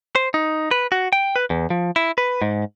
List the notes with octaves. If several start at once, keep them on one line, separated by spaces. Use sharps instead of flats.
C5
D#4
B4
F#4
G5
B4
E2
F3
E4
B4
G#2